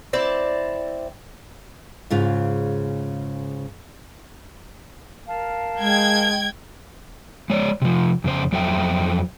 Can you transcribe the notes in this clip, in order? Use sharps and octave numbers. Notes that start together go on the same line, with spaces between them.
C4 E4 D5
G#2 C#3 F4
A#4 F5 A5
G#3 G5 G#6
G#3 C#5 D5
C3 F3
F2 C#3 C5
F2 F#3 A4 C5 E5 G5